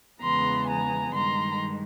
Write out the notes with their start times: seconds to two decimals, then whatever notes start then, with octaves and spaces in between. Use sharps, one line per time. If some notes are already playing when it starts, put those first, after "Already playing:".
0.22 E2 C#3 E3 G#3 B3 A#5 C6
0.68 G#5 A#5
1.14 G2 D#3 G#3 A#5 C6